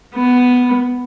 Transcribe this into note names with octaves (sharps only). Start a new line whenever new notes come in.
B3